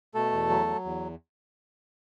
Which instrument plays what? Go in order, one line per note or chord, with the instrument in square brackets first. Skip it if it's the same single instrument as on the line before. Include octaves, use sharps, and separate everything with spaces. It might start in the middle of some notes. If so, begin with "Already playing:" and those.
[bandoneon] B2 A3 A4
E2
F#3
F#3
E2